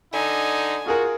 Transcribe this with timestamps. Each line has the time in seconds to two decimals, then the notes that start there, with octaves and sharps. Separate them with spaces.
0.13 D3 D#4 G#5
0.86 F4 F#4 G#4 A#4